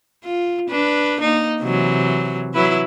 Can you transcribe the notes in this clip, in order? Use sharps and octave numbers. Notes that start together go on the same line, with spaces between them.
F4
D4 B4
A#3 D#4
C3 E3 F#3
F#3 E4 B4